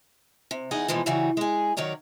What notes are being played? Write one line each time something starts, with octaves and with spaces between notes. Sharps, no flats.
C3
E2 D#4 G#4 F#5
B2 E3 F3 G#3 A#3
C#3 E3 G3 F#4
G#3 G#4
D#3 F#3 A#4 C#5 D5